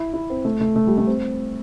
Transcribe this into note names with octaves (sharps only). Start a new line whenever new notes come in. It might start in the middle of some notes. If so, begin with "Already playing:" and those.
Already playing: E4
E4
C4
A3
A3
A3
G3
A3
C4